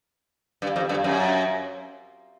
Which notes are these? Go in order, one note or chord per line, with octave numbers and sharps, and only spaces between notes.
G2
F2
G2
F#2